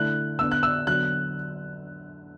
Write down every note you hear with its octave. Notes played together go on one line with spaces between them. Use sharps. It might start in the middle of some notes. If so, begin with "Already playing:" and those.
Already playing: D3 A3 E4 F#6
D3 B3 D4 E6
F#6
E6
D3 F#3 B3 F#6